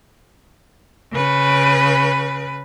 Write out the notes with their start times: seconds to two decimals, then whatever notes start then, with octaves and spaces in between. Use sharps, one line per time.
1.13 C#3 B4